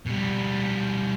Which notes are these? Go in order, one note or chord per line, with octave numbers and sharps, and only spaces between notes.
B2 G3